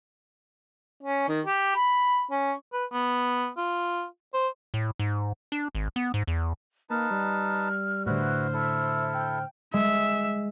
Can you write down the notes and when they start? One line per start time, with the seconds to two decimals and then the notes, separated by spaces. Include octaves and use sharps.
1.03 C#4
1.28 D#3
1.46 G4
1.76 B5
2.31 C#4
2.73 B4
2.92 B3
3.57 F4
4.34 C5
4.74 A2
4.99 G#2
5.52 D4
5.75 G#1
5.96 B3
6.14 G#2
6.27 E2
6.90 A#3 D#4 B4 A5 E6 F6
7.11 G3
8.06 A2 D3 E4 F#4 B4 C5 F6
8.54 E4 A4 E5
9.14 G5
9.74 G#3 E5